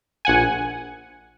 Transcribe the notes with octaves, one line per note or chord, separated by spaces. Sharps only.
A#1 F#5 G#5